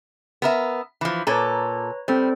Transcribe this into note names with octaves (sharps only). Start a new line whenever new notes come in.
B3 A#4 E5
E3 F3
A#2 A4 B4 C#5 A#5
G3 C4 A4 C5